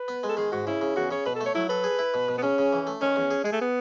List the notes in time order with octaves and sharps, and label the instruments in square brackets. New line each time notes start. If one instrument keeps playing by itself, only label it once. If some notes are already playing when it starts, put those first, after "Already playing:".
Already playing: [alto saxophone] B4
[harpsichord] B3
G#3
[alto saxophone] A4
[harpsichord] D#3 [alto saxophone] G#4
[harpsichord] G#2 [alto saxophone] F#4
[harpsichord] C#3 [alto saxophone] E4
[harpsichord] C#3
[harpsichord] E2 [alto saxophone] F#4
[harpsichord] C#3 [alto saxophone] C#5
[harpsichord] B2 [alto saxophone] B4
[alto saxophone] A4
[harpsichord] A3 [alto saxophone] C#5
[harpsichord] F#3 [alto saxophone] E4
[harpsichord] A4 [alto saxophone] B4
[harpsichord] G#4
E4
B2
B2
[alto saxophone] B3
[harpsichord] C#3 [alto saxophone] C#4
[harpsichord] C#3
E3
A3
[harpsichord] D#3 [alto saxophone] C#4
[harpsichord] E2
G#4
[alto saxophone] G#3 [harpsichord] G#4
[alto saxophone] A3
B3